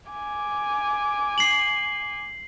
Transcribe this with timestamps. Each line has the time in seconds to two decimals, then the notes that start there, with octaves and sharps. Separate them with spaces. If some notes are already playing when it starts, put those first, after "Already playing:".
0.10 G#5 D6
1.38 C7 F#7